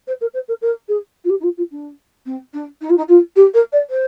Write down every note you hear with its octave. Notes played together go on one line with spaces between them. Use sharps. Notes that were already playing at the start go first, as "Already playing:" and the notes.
C5
A#4
C5
A#4
A#4
G#4
F4
G4
D#4
F4
F4
D4
C4
D4
D#4
F4
D#4
F4
G4
A#4
D5
C5